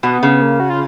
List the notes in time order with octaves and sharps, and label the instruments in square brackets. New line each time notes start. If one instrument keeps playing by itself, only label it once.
[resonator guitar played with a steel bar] B2 [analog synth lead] B3
[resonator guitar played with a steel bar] C#3
[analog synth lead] A#3
F#4
F4